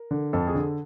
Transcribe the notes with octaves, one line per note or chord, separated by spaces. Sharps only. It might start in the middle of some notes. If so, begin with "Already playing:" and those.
Already playing: A#4
D3
F2 A4
G#4
D3